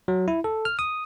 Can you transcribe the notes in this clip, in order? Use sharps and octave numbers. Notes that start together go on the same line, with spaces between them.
F#3
E4
A4
F6
D#6